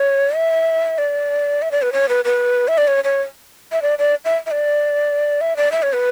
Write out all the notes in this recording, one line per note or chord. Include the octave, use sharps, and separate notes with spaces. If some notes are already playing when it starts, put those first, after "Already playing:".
Already playing: C#5
E5
D5
E5
D5
B4
C#5
B4
B4
E5
D5
C#5
C#5
E5
D5
D5
E5
E5
D5
E5
D5
E5
C#5
B4